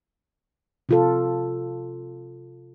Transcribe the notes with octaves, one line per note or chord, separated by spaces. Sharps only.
C3 F4 A4